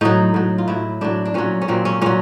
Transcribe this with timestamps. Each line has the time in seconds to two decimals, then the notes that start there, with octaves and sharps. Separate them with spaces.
0.01 A2 F#3 D#4
0.34 A2 F#3
0.58 F4
0.68 A2 F#3 E4
1.01 A2 F#3 D4
1.25 D4
1.34 A#2 F#3 C#4
1.62 C#4
1.68 A#2 F#3 C4
1.85 C#4
2.01 A#2 F#3 C#4